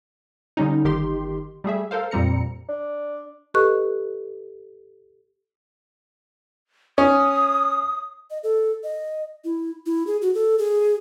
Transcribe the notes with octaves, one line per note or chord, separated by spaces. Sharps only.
D3 G3 C#4 D#4
G1 D#3 G4 C6
G3 A3 G#4 E5
A4 A#4 C5 F5
F2 A#2 G3 C4 A#5 C#7
D4
G4 A4 B4 D#5 C#6 F#6
C#4 D#6
D#5
A4
D#5
E4
E4
G#4
F#4
A4
G#4